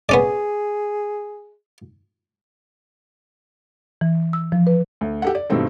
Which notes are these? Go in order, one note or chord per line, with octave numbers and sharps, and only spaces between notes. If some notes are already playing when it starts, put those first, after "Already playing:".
B3 C#4 G#4 D5
E3
E6
F3
B4
D2
G4 A4 F#5
D5
G2 B2 D#3 A3 C4 A4